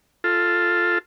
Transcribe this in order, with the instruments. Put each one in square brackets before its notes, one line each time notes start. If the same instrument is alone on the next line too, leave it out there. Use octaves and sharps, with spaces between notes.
[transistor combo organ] F4 A4